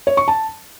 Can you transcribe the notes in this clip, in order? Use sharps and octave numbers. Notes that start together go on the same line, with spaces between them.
C#5
C#6
A5